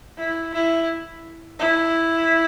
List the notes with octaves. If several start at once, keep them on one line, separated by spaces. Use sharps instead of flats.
E4
E4
E4